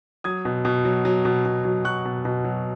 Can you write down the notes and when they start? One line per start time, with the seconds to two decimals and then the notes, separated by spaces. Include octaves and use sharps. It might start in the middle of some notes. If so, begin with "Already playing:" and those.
0.24 F#3 D#6 G#6
0.45 B2
0.65 B2
0.85 F#3
1.05 F#3
1.25 B2
1.45 B2
1.65 F#3
1.85 F#3 C#6 F#6
2.05 B2
2.25 B2
2.45 F#3